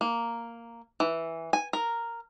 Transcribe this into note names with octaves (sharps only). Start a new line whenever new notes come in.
A#3
E3
G#5
A#4